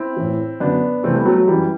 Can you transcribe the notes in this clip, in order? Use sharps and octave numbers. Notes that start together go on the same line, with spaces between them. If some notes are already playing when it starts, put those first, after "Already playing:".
Already playing: C4 E4
A2 E3
F#2 D3 B3 D4
E2 C3 E3 A3 C4
G3 B3
F#3 A3
F#3
F#2 E3 G3